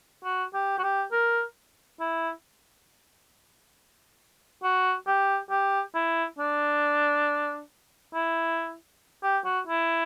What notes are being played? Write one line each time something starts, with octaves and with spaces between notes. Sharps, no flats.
F#4
G4
F#4
G4
A#4
E4
F#4
G4
G4
E4
D4
E4
G4
F#4
E4